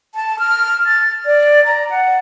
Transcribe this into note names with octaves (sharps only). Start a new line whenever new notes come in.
A5
F6
A6
D5
A#5
F#5